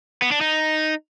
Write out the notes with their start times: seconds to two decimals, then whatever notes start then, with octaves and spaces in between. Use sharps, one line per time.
0.22 B3
0.32 D4
0.41 D#4